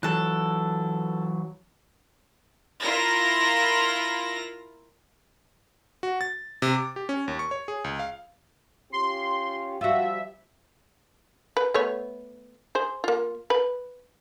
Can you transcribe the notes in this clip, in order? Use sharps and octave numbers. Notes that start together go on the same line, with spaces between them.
E3 F#3 A4 F#6
E4 F4 A#4 A#6
F#4
A6
C3
D6
G4
C#4
D#2
C#6
C#5
G#4
C#2
F5
C#4 F4 G4 C6
F3 G3 F4 F#4 E5
B4
A3 B3 C#5
G#4 C5
A#3 F4
B4